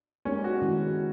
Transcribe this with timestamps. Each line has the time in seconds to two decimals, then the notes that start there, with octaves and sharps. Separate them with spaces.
0.25 G#3 B3 C#4 D#4 G4 A#4
0.44 F#4
0.62 D#3 G#3 C#4 E4 A4